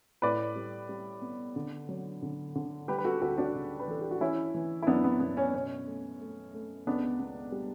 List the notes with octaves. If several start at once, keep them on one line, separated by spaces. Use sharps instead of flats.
A2 B4 D5
G3
G3
B3
D3
F#3
D3
D3
G3 G4 B4
B4
F#4 A4
D2 F#4 A4
D4 F#4
C#3
B4
E3 A4
G4
F#4
E3 C#4 E4
E3
E4
F#2 B3 D4
B3
F#2 B3
C#4
B2 C#4
A3
A3
A3
C#2 B3 D4
B3
G3